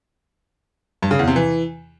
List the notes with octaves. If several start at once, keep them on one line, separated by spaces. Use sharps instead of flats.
G2
C#3
E2
C3
E3